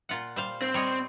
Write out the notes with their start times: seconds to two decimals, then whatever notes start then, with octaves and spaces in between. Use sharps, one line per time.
0.09 A#2 F4 F#5
0.36 G3 C5 F5
0.62 C4
0.74 G3 C#5 D#5